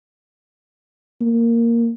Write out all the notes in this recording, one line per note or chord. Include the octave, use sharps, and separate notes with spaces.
A#3